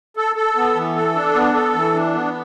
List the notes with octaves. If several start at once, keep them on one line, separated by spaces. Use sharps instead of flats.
A4
A4
B3
E3
A4
D4
B3
A4
E3
D4
B3